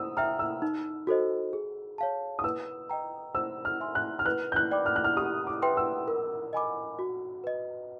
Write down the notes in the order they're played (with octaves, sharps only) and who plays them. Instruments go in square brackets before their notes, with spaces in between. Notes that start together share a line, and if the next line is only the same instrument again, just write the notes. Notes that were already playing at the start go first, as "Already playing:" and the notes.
Already playing: [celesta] C5 [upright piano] D#6 E6
[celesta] E5 G5 A#5 [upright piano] F6
[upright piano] E6
[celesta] D#4
F#4 A4 C5 D#5
G#4
C#5 F5 A5
[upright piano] D#6
[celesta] B4 [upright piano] E6
[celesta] D#5 G5 A#5
[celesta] C5 [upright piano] E6
[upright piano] F6
[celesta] E5 G#5 C6
[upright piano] F#6
F6
[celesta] B4 [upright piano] F#6
[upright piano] G6
F#6
[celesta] D5 G5 B5 D6
[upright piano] F6
F#6
F6
[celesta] G4 [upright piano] D#6
[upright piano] D6
[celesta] B4 E5 G5 C6
[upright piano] E6
[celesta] A#4
D#5 G#5 B5 D6
F#4
B4 D#5